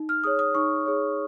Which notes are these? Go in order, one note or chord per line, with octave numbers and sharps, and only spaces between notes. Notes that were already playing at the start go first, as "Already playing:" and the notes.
Already playing: D#4
F6
G#4 C#5 D#6
D#6
D#4 C#6
G#4 C#5